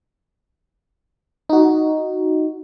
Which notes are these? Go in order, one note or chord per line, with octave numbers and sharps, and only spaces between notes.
D#4 F#4